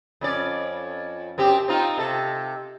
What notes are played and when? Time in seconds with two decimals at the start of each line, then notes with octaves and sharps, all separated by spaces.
0.21 F2 C#4 D5
1.38 F#2 C4 G4
1.68 C4 D#4 F4
1.98 C3 A4